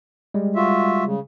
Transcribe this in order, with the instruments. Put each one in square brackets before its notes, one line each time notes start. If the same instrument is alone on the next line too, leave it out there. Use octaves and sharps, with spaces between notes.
[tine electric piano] G3 G#3
[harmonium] F4 F#4 E5
C#3